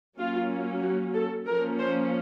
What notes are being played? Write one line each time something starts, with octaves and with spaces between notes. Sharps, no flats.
F#3 A#3 C#4 F4
F#4
A4
F3 A#3 C#4 A#4
C5